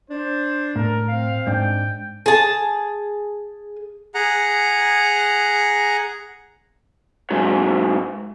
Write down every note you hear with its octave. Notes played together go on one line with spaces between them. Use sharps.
D4 C5
A2 A#4
C4 F5
G#2 D4 G5
G#4 A5
G#4 F#5 A#5
G#2 F#3